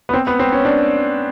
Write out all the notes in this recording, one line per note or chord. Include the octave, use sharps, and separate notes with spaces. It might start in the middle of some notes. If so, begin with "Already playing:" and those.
B3
C4
B3
C4
C#4
D4